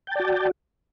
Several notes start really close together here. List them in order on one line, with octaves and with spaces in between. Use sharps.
G5 A5 D5 F#4